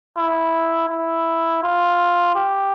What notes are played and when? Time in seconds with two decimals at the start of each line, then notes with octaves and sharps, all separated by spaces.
0.17 E4
0.89 E4
1.63 F4
2.35 G4